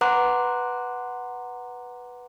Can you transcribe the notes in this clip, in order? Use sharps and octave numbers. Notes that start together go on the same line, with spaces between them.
B4 F#5 A#5 C6 D6 F#6